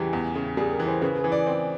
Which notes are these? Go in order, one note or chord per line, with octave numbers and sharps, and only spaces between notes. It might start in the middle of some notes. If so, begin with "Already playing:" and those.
Already playing: E2 C#3 E3 G3 G4
E2
C#3
G3 G#4
A#4
E3
C5
C#3 B4
G#4
E3
D5
C4